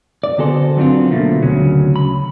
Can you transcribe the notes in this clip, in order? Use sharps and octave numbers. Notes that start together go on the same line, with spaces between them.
D5
D3 B3 F#4 G#4 A4 C5
F#3 B3 C4 D4 F4
B2 D3 F3 A3 A#3
D2 C#3 F#3 C#4
B5